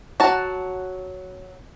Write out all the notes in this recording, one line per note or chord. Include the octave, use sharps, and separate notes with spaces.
F#3 F#4 A5